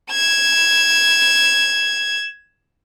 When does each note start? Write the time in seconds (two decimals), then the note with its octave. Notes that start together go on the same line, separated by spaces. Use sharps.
0.10 G#6 E7